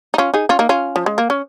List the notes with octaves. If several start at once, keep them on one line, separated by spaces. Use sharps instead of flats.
D#4
C#4 F4
D#4 G#4
C#4 F4
A#3 D#4
C#4 F4
F3
G#3
A#3
C#4